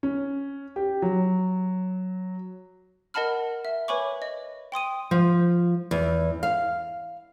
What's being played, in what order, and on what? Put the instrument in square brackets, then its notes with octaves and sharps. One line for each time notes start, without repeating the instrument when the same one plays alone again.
[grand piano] C#4
G4
F#3
[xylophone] A#4 D#5 F#5 A5 B5 F6
E5
B4 C#5 G#5 B5 C#6 D6
D#5
G5 C6 D#6 D#7
[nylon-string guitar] F3
E2
F5